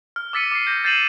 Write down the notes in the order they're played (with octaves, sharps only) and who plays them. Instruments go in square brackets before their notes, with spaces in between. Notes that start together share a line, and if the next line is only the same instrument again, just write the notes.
[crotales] F6
D6 E6 A6 B6 C#7 D#7
D6 C7
G6 A#6
G6 A6 C7 D#7 E7 F#7